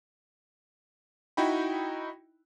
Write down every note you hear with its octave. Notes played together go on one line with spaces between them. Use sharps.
D#4 E4 F#4 G5 B5